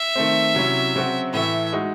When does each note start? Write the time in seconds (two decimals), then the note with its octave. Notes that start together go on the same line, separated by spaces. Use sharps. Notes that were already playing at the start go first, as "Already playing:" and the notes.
Already playing: E5
0.16 D#3 A3 C4
0.55 C3 F#3 C#4 E4
0.94 C#3 F#3 C4 F#4
1.33 A2 E3 A3 E5
1.73 G#3 D#4 F#4